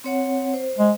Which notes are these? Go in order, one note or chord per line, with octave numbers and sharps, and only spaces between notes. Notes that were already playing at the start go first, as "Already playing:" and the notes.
C4 C#5 F#5
C5
G#3